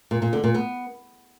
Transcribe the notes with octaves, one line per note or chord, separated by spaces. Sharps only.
A#2
A#2
D3
A#2
B3